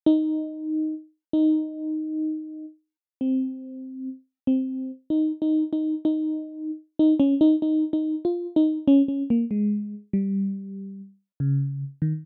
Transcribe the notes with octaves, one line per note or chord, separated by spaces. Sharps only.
D#4
D#4
C4
C4
D#4
D#4
D#4
D#4
D#4
C#4
D#4
D#4
D#4
F4
D#4
C#4
C#4
A#3
G#3
G3
C#3
D#3